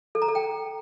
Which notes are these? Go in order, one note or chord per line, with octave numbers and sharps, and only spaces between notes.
A4
A#5
A4
G5